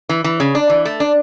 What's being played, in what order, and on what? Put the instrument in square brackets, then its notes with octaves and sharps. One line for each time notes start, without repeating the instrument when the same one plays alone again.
[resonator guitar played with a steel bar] E3
E3
C#3
D4
E3
A3
D4